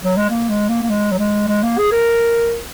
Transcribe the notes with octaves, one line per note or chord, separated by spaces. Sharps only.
F#3
G#3
A#3
G#3
A#3
A#3
G#3
F#3
G#3
G#3
A#3
G#4
A#4